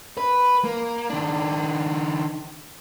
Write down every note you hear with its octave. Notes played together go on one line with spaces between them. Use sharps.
B4
A#3
D#3 D4